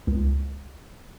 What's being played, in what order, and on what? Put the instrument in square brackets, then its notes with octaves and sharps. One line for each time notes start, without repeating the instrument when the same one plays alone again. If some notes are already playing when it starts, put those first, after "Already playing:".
[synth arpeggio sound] C#2